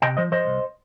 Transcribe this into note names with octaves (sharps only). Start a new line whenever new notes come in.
C3 D#5 G5
F3 C5 D#5
F3 C5 D#5
C2